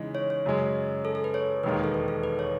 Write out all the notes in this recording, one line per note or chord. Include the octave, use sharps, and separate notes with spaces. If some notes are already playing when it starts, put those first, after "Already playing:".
Already playing: C#3 E3 G#3 D#4
C#5
C#5
F#2 C#3 G#3
A4
A4
B4
C#5
E1 D#2 D#3 G#3 B4
B4
A4
B4
A4
B4
C#5